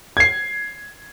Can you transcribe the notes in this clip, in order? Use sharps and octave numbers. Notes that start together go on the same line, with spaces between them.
G#6 C7